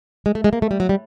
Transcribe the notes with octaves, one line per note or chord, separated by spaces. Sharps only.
G#3
A3
G#3
A#3
A3
G3
F#3
G3